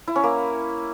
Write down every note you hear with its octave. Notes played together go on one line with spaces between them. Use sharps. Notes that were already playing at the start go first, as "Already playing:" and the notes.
E4
C#4
A#3